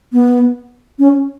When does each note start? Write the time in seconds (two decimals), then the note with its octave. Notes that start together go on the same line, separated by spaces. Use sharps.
0.13 B3
0.99 C#4